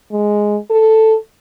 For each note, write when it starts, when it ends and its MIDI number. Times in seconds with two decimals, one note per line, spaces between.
0.12 0.57 56
0.70 1.16 69